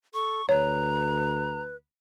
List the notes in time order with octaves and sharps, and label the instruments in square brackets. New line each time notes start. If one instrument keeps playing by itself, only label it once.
[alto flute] A4 [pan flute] C#6
[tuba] D2 [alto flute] B4 [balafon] C#5 [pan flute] A#5